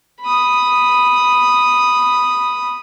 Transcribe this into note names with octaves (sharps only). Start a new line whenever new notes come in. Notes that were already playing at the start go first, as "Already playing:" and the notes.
B5 D#6